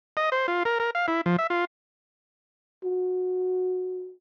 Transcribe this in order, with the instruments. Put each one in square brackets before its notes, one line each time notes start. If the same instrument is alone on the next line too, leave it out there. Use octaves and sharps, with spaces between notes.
[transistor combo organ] D#5
C5
F4
A#4
A#4
F5
E4
F3
E5
F4
[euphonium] F#4